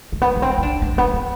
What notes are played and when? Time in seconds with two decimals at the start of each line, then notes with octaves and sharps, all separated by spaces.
0.12 A3
0.22 B3
0.36 B3
0.42 C4
0.58 E4
0.63 D4
0.82 B3
0.92 A3
0.98 B3
1.13 C4